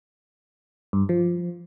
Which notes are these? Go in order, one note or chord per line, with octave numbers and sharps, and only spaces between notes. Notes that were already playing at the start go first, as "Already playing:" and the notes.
G2
F3